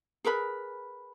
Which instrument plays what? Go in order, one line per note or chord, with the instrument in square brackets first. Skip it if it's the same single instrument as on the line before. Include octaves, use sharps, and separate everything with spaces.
[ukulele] G#4 A#4 B4 B5